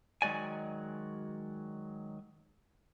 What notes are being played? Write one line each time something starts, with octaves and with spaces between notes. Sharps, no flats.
D#3 F#3 G#3 F#4 D5 G#5